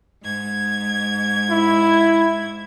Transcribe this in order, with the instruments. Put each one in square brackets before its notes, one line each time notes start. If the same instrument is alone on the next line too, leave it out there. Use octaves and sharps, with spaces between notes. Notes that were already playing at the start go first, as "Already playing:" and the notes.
[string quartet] G#2 G#6
[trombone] E4